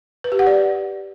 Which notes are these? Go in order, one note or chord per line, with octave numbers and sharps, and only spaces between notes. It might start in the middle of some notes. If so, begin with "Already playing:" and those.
B4
G4
F#5
D5